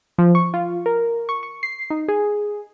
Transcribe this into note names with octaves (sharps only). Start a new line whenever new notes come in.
F3
C#6
F4
A#4
C#6
C#6
C7
D#4
G#4